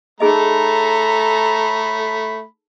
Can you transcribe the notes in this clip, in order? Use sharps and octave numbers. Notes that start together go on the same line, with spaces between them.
A3 D#4 G#4 A4 D#5 A#5 B5